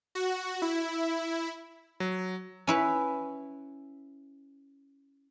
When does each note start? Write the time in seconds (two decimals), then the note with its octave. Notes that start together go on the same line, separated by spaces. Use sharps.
0.15 F#4
0.62 E4
2.00 F#3
2.67 C#4 E4 B4